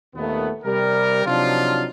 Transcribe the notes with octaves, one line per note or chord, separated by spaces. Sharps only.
D#2 A#2 D#3 A3 B3
C3 G3 A#4
C3 F3 F#3 D4 D#4 F4